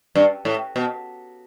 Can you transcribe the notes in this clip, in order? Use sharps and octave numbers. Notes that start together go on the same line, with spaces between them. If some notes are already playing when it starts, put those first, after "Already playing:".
G2
A2
B2